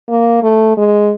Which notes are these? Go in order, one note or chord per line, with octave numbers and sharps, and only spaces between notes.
A#3
A3
G#3